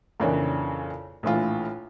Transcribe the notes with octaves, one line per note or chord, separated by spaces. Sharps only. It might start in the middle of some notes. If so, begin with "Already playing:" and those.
F2 A#2 C#3 E3 A#3 D4
A#1 A2 E3 F4